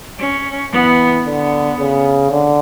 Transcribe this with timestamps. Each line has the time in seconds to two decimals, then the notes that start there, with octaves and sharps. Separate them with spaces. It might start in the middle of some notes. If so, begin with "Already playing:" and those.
0.19 C#4
0.72 E3 B3
1.26 D3 B3
1.79 C#3
2.32 D3